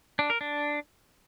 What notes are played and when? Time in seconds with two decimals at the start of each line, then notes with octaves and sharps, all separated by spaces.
0.19 D4
0.30 A#4
0.41 D4